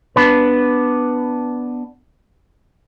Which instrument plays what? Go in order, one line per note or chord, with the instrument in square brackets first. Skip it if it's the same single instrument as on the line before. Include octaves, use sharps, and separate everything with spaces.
[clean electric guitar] B3 D4 B4